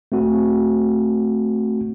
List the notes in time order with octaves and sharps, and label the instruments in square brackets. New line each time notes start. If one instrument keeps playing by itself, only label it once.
[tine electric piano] A3 C4 F#4